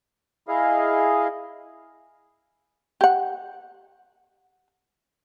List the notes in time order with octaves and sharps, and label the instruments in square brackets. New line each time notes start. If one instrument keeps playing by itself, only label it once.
[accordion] E4 G#4 D#5 F5
[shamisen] G4 F#5